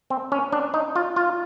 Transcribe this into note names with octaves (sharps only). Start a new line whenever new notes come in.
C4
C#4
D4
D#4
F4
F4